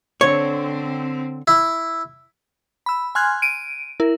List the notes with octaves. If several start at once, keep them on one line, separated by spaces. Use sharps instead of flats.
D3 C4 C#5
E4
B5 E6
G#5 C6 F6 F#6 G#6
D7 D#7
E4 A#4